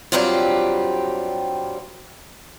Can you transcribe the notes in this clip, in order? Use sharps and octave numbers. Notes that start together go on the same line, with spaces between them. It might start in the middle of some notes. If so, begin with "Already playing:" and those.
G2 F#3 G3 C4 F4 G4